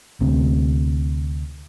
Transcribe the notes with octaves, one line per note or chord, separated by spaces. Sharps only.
D2 C3